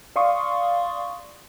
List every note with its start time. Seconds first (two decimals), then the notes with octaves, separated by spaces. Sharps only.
0.16 D5 F5 C6 C#6 D#6